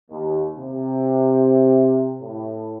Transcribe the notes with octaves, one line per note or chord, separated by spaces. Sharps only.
D#2
C3
A2